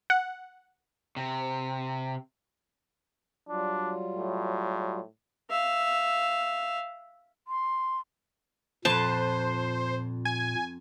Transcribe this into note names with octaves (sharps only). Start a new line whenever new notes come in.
F#5
C3
F#3 G3 D4 F4
A2
E5 F5
C6
F2 A#2 B4 C5 A5
G#5